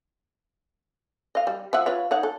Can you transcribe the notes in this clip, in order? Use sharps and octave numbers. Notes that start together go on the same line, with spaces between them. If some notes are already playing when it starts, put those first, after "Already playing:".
D#5 F5
G3
F3 E5 F#5
F4 B4 C#5
D#4 C#5 F#5
A4